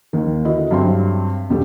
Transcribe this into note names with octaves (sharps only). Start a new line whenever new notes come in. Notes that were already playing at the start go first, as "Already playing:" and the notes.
D#2 D#3
D3 E4 F#4 D#5
G2 F#3 C4 E5 C6
E1 A#1 B2 G3 G4 A4